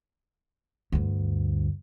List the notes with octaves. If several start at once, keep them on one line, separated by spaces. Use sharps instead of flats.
D2 G2